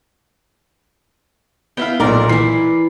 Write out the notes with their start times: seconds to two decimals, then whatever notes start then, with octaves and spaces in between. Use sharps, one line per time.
1.77 B3 E4 F5 G5
2.00 B1 A#2 A#4 D5
2.29 E3 E4 C7